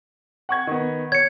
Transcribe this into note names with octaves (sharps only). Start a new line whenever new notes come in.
F#5 C#6 G#6
D#3 B3
C#5 G#6 C#7